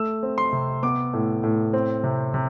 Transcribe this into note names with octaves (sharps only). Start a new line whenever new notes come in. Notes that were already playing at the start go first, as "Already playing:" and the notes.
Already playing: A3 E6
C4
C6
C3
B3 D6
A2
A2
C4
C3
C3